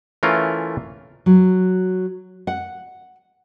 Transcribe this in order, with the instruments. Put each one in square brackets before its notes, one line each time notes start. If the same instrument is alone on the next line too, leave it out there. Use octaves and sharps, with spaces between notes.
[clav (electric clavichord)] E3 A3 C#4 F4 A#4
[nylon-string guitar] F#3
F#5